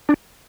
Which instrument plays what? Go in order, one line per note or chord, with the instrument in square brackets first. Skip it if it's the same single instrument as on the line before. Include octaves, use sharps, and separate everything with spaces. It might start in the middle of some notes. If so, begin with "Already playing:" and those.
[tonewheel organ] D4